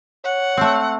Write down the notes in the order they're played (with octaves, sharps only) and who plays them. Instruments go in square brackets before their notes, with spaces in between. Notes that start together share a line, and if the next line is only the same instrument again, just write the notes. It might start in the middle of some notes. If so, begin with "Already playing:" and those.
[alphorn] C#5 [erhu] F#5
[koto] A3 C4